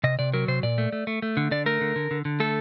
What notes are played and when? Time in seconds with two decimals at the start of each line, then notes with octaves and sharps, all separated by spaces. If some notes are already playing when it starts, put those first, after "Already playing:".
0.04 C3 D#5
0.19 C3 D5
0.34 F#3 A#4
0.48 C3 C5
0.63 A#2 D5
0.78 A3
0.92 A3
1.07 A3
1.22 A3
1.37 D3
1.51 D3 D5
1.66 A3 A#4
1.81 D3
1.96 D3
2.11 D3
2.25 D3
2.40 A3 A4